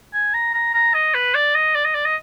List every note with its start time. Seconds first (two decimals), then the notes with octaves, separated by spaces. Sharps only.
0.14 G#5
0.34 A#5
0.54 A#5
0.74 A#5
0.94 D#5
1.15 B4
1.35 D5
1.55 D#5
1.75 D5
1.85 D#5
1.95 D5
2.06 D#5